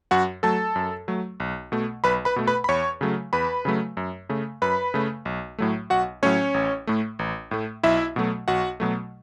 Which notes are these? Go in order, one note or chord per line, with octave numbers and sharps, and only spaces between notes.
F#2 F#4 F#5
F#3 A3 A4 A5
F#2
F#3 A3
B1
B2 A3
B1 B4 B5
B4 B5
B2 A3
B4 B5
B5
E2 C#5 C#6
C#3 F#3 A3
E2 B4 B5
C#3 F#3 A3
F#2
C#3 A3
F#2 B4 B5
C#3 A3
B1
A2 F#3 A3
B1 F#4 F#5
A2 F#3 A3 C#4 C#5
A1
A2 A3
A1
A2 A3
B1 E4 E5
B2 F#3 A3
B1 F#4 F#5
B2 F#3 A3